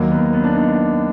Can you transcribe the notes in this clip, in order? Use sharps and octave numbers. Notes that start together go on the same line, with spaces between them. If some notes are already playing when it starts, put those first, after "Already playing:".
Already playing: D#2 D#3 F#3 A#3
B3
B3
D4
D#4